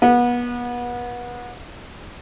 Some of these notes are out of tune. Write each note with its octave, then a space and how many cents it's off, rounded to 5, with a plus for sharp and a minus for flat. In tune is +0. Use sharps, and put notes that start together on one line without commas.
B3 -30